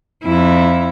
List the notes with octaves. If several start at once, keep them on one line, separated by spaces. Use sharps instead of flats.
F2 E4